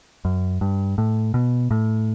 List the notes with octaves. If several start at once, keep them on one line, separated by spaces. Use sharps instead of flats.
F#2
G2
A2
B2
A2